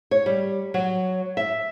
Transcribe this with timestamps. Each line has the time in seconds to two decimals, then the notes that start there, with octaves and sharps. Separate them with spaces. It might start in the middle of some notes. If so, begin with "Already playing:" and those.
0.11 C#5
0.26 G3
0.74 F#3
1.37 E5